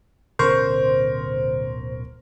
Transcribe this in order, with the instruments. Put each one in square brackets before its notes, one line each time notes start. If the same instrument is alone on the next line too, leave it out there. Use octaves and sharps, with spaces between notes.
[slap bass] D1 B2 C#4 [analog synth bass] D3 [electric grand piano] A#4 C#6 [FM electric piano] C5